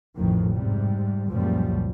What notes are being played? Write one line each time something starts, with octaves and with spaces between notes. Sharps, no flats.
A1 F2 A2 D#3 F3
G#2 C3 G3
C#2 F#2 A#2 F3 G3